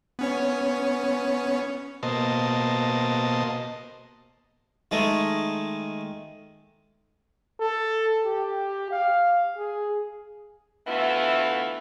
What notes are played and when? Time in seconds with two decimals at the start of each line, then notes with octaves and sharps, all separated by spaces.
0.19 B3 C#4 C#5
2.03 B2 A#3 C5 D#5 A5
4.91 D#3 G#3 A3
7.60 A4
8.25 G4
8.91 F5
9.57 G#4
10.87 D2 E3 A3 B3 F4 E5